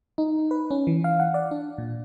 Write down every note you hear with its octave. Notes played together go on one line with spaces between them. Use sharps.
D#4
B4
C#4
E3
F5
F#5
D5
D4
A#2